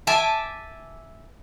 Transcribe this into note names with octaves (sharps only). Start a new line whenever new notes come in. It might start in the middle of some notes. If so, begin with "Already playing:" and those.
E5 G#5 A5 D6